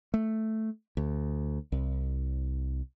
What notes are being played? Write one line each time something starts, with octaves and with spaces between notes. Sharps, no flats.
A3
D2
C2